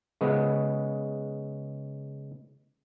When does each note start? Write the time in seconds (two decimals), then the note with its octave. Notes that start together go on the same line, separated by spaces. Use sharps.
0.21 C#3 G#3 B3